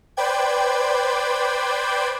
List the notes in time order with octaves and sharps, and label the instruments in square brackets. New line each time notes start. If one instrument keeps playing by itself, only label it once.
[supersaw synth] B4 C5 D5 G5 G#6